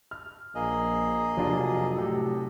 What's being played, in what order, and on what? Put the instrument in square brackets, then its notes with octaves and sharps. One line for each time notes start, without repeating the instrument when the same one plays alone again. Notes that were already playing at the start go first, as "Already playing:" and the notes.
[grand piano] F6
[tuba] A#1 [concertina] A#3 G#4 D#5
[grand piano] F1 D4 F4 [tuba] F#3
[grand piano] A2 C3 [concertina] A4